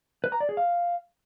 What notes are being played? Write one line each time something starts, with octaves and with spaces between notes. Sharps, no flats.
B4
A#5
D5
G#4
F5